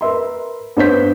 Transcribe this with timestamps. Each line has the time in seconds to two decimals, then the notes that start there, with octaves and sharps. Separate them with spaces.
0.01 A#4 B4 E5 C6
0.77 G2 B3 C5 C#5 G6 B6